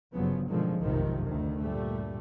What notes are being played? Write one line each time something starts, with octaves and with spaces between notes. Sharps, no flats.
G1 G2 C#3 F3 F#3 B3
B2 D3 D#3 F3 F#3 G#3
F1 B1 F#2 C3 D#3 F3
D2 D#3
G2 A#2 G3 A3